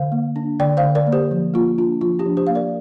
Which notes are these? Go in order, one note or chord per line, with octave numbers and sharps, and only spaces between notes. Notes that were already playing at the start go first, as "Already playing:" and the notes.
Already playing: D3 C5 F5
A#3
D4
D3 D5 G5
C5 F5
D3
A#4 D5
A#3
G4 C5
F3
A#3 F4
D4 F4
F3 F4
D4 G4
F3
G4 C5
A#3 F5
A#4 D5